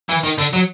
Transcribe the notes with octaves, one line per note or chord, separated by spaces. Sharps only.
E3
D#3
D3
F#3